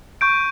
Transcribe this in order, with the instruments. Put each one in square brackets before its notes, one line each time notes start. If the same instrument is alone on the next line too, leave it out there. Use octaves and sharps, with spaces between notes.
[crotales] C#6 G6 D7